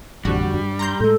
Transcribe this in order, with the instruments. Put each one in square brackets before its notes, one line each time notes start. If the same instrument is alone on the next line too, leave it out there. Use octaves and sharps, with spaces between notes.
[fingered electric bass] A1 [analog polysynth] F2 D3 F#4 [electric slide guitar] G3
[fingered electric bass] G2
[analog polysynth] A#5 C6 G6
[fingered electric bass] A2 G#3 [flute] A4